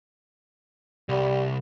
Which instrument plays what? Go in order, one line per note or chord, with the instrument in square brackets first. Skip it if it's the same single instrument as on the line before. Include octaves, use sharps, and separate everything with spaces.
[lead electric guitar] C2 [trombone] G3